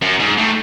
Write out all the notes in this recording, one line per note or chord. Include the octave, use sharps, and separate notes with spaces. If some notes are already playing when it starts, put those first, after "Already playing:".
F#2
G#2
A2